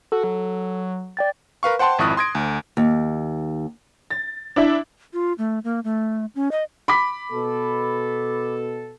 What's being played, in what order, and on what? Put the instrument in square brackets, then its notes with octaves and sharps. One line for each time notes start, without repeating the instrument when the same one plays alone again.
[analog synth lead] F#4 [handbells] A4
[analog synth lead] F#3 [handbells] A4
[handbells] D5 G5 A6
[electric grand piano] A#4 B4 F5 C#6
C5 F#5 G5 A5 C6
G#1 F2 E4 C#6 D#6 F#6
C6 D#6 G#6 A#6 D7
D2
[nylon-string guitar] D#2
[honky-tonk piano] A6
D4 E4 E5
[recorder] F4
A3
A#3
A3
C#4
D#5
[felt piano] B5 D6 B6
[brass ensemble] B2 A4